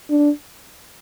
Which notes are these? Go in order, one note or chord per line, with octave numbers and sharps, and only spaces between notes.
D4